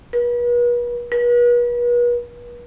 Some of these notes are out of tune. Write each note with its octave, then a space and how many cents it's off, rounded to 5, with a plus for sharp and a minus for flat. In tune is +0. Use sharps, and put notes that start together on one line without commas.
B4 -40
B4 -40